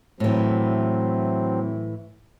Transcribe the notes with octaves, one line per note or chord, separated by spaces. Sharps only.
A2 E3 F#3 C4